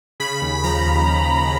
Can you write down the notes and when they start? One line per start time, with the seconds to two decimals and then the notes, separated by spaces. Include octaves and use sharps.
0.20 C#3 B5
0.42 D#2
0.64 F3 A#5
0.86 D#2